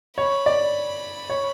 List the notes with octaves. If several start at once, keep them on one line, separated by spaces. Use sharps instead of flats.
C#5 B5
D5
C#5